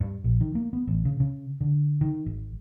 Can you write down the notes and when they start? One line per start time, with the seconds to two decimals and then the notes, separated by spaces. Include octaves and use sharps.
0.01 G2
0.24 A#1
0.41 D#3
0.55 A#3
0.73 B3
0.87 A1
1.05 C#3
1.20 C#3
1.61 D3
2.01 D#3
2.26 G#1